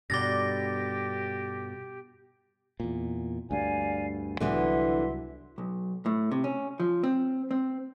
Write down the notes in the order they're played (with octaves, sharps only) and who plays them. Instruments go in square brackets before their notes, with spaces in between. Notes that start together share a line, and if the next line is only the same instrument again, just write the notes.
[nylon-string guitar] G2 B2 [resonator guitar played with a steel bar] D3 G3 [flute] G4 [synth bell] D6 A6 A#6
[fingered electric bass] E2 A#2
[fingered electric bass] D2 G2 [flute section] D5 F5 G#5
[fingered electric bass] C2 F#3 [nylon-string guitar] D3 E3 B3 [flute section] E5 C6
[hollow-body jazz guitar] B1
A2
C3
C#4
F3
C4
C4